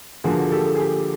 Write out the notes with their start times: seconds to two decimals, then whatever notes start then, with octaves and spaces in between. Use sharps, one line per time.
0.24 D3 F3 A#3 F#4 G#4
0.52 G4 A4
0.75 G#4
0.80 G4